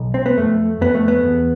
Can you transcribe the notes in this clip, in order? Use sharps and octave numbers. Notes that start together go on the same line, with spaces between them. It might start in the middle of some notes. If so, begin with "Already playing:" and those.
Already playing: B1
C4
B3
F2 A3
F2 B3
A3
B3
E2